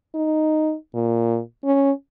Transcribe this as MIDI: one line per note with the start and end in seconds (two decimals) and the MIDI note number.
0.15 0.74 63
0.94 1.40 46
1.64 1.92 61